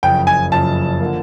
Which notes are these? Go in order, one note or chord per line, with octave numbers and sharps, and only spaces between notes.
F#1 F2 C#3 G5
G#5
F#1 F2 C#3 A5
D3 F3 A#3